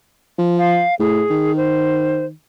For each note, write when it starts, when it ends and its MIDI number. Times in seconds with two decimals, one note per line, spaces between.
0.39 0.83 53
0.58 0.95 77
0.99 1.23 45
0.99 1.55 68
1.30 2.31 51
1.56 2.25 72